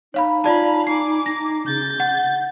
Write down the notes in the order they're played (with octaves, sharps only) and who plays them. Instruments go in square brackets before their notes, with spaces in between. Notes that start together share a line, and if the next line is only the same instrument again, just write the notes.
[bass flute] D#4 [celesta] C#5 F5 B5
[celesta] F4 D5 A5 [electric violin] F5 B5
[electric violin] G#5 D6 [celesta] C7
[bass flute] D#4 [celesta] A#6
[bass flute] C#3 [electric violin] G6 A6
[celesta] F#5